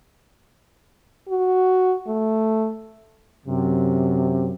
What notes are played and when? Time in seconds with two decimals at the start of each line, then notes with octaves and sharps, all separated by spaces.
1.29 F#4
2.07 A3
3.46 F#2 C3